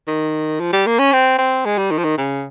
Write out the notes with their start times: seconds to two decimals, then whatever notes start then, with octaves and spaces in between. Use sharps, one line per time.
0.07 D#3
0.60 F3
0.73 G3
0.86 A#3
0.99 C#4
1.12 C4
1.38 C4
1.65 G#3
1.78 G3
1.91 D#3
1.98 F3
2.04 D#3
2.18 C#3